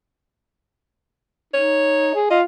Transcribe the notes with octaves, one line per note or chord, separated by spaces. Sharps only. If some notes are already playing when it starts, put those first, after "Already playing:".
D#4 C#5
G#4
F4 D#5